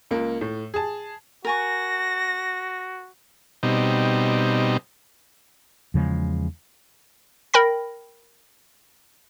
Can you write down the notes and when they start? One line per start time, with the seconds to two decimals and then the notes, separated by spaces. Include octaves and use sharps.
0.11 C#2 A#3
0.41 A2
0.74 G#4 A5
1.45 F#4 A#4 G#5 C#6 A#6
3.63 B2 G3 C4 D#4
5.94 E2 C#3 F3 G#3
7.54 A#4 G5 B5 A#6